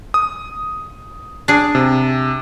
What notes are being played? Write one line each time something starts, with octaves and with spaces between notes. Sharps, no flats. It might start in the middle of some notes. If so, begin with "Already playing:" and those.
D#6
D4 G#4
C3